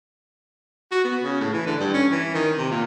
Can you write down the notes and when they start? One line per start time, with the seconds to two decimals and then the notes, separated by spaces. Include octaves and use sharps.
0.92 F#4
1.04 B3
1.23 C#3
1.40 A2
1.53 E3
1.67 D3
1.80 G2
1.94 C#4
2.12 E3
2.34 D#3
2.58 C3
2.71 A#2